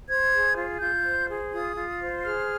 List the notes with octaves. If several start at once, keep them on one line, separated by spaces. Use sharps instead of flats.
C5 G#6
G#4
F4
F4 G6
C5
G#4
F4 D#6
F4
C5
G#4 F6